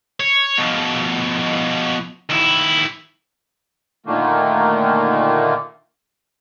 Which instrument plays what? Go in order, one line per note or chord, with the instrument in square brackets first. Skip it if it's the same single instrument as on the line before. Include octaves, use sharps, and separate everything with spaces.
[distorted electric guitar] C#5
B2 F3
D#2 E4
[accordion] A#2 D3 D#3 A3 A#3